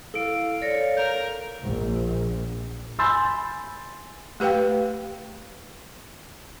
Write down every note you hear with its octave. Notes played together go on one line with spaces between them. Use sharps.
E4 A4 F5 D7
A4 C#5 D5 A#6 C#7
A#4 G6
A#1
G#5 B5 C6 E6 G6 A6
A3 G4 B4 F5 G5